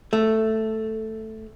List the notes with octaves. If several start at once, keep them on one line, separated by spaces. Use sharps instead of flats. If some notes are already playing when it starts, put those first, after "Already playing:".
A3